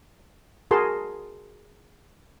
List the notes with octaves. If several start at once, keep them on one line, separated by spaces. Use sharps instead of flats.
F#4 G#4 A#4 A5 C6